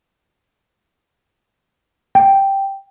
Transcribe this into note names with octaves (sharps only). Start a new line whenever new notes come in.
G5